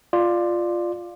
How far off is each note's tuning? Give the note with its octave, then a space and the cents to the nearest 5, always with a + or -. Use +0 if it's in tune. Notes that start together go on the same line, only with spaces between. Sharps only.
F4 +0 D5 +15